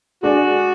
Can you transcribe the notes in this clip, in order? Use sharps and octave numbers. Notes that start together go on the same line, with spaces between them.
G#3 D4 F#4 G#4 D5